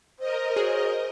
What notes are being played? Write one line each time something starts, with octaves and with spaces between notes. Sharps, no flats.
A#4 C5 D#5
F#4 G#4 C#5